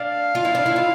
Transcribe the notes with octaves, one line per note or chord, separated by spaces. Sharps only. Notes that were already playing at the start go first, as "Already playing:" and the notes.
Already playing: D4 F5
F4
E4
D4
E4
F4